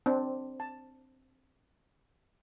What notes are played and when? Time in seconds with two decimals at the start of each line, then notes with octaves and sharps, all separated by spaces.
0.06 C4 D4
0.60 A5